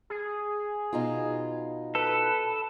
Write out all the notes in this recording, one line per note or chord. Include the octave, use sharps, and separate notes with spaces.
G#4
B2 D#4 F4
A4 B4